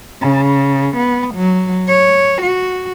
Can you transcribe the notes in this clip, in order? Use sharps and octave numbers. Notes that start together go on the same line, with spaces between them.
C#3
B3
F#3
C#5
F#4